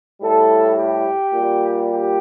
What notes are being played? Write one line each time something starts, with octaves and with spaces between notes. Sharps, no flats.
A2 G3 A4
G4
A#2 G3
G4